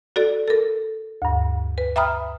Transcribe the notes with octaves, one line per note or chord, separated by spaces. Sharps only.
F#4 A4 D5
A4 A#4
D2 G2
B4
E5 G5 A#5 B5 D#6 F6